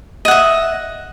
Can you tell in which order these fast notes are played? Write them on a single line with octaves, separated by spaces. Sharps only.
D#5 F#5 E5